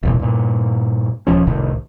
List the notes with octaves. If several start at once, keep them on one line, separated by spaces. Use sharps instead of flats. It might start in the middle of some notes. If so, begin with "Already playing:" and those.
E1 C2 A#2
G2 A#2
D#1 F3 C#4
F1 C2 A2 D#3